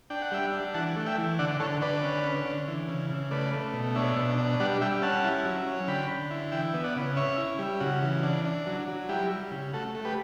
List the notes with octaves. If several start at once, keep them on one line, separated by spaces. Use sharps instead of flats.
D4 G5
F#5
G3 E5 G5
D4
E3 F#5 A5
A3
E5 G5
E3
D3 D5 F#5
D3 A4 C#5
D3 B4 D5
C#4
C#4
D3
E3
C#3
C#3
A3 B4 D5
A3
B2
D4 C#5 E5
B2
D4
G3 D5 F#5
G3 E5 G5
C#4 F#5 A5
E4
F#3
C#4
D3 G5 B5
D3
E4
E3 E5 G5
B3
D5 F#5
C#3
C#4 C#5 E5
E4
G3
C#3 F#4
E3
D4
D4
F#3
F#3
G3 E4 G4
G3
C#3
A3 F#4 A4
A3
G4 B4